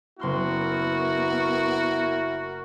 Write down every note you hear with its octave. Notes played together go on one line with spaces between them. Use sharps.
F#1 B3 E4 F#4 A#4 C6 F6